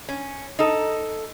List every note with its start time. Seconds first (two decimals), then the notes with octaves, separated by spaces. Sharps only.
0.09 C#4
0.59 D#4 A4